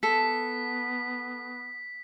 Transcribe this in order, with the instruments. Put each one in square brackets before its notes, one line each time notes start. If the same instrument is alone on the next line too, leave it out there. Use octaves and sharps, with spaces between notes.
[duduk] B3 [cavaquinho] A4 [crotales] B6